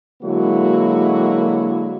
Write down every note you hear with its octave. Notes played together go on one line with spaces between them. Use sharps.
D3 F#3 G#3 A#3 E4 F#4